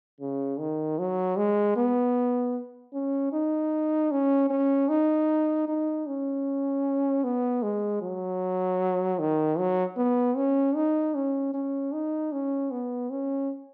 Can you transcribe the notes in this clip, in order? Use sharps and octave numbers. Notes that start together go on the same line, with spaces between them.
C#3
D#3
F#3
G#3
B3
C#4
D#4
C#4
C#4
D#4
D#4
C#4
B3
G#3
F#3
D#3
F#3
B3
C#4
D#4
C#4
C#4
D#4
C#4
B3
C#4